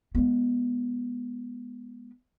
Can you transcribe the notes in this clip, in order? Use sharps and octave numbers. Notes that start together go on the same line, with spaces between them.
G#3 B3